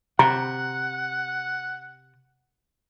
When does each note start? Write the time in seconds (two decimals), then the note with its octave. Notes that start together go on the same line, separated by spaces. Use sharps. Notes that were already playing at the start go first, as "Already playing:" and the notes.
0.19 C3 F#5 A#5